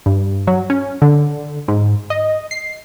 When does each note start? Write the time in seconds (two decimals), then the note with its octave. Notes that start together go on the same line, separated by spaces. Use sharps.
0.06 G2
0.47 F#3
0.70 C#4
1.02 D3
1.68 G#2
2.10 D#5
2.51 C7